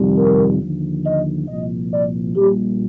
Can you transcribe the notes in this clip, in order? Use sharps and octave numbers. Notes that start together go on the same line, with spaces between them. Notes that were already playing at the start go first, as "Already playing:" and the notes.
Already playing: F2 C3 D#3 G3
A#4
D#2 D3 F3
D#5
C2 A#2 F3 D#5
D5
A#1 A#2 G3 G4